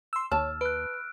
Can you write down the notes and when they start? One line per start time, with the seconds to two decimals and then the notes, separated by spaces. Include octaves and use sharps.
0.13 C6 E6
0.32 D#2 C#5 A5 E6 F6
0.61 B4 F#6 D7